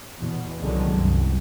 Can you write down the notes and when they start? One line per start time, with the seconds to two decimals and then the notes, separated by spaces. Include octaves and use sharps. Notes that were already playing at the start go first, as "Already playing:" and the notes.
0.20 E2 B2
0.60 C2 B2 D3 D#3 F#3 G#3
0.94 C2 F#2